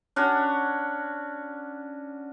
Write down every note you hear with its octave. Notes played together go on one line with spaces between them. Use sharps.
C#4 D4 F#4